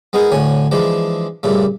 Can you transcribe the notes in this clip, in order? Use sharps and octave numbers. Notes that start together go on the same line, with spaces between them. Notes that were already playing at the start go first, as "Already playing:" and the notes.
G#3 B3 D#4 G#4 A#4
D2 A2 D3 C#5 G#5
E3 F3 G#3 D4
G2 A#2 C#3 A3